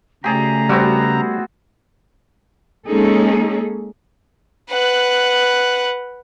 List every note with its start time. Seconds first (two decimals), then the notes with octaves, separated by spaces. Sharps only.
0.24 C#3 A3 G4 G#4 D5 A#5
0.69 G3 B3 C4 F#4
2.87 G#3 A#3 C#4 D#4 G#4 A4
4.70 B4 F#5